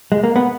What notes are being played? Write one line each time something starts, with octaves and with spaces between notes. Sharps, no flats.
G#3
A#3
B3